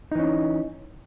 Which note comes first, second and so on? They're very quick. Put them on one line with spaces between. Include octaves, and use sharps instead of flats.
D#4 E3 C#4